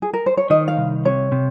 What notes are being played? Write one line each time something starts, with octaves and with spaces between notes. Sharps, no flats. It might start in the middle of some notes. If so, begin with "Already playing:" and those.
G#4
A#4
C5
C#5
D#3 D#5
F5
C2
C3 C#5
C3